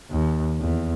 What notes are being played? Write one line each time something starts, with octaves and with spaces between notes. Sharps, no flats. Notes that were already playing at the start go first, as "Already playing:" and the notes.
D#2
E2